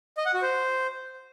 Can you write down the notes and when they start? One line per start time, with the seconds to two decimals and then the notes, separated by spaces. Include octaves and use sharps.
0.18 D#5
0.26 F#5
0.34 F#4
0.42 C5